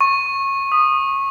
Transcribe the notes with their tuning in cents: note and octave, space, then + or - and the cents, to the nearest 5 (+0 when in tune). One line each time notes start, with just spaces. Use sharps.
C#6 -20
D#6 -20